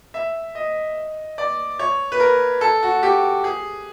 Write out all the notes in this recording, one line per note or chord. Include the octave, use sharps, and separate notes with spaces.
E5
D#5
D5
C#5
B4
A#4
A4
F#4
G4
G#4